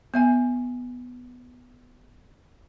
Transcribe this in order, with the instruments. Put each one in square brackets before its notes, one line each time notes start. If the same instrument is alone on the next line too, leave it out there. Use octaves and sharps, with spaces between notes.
[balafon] B3 E5 G#5